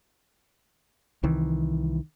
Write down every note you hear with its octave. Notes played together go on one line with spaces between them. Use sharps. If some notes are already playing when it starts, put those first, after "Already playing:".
C2 D#3 E3